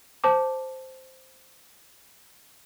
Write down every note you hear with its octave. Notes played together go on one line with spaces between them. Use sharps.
C5 A5 D6